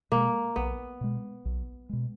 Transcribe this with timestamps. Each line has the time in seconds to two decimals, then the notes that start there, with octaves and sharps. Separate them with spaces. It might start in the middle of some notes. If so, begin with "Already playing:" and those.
0.12 B2 G#3 A#3
0.56 B1 B3
1.01 B2 G#3
1.45 B1
1.89 B2 G#3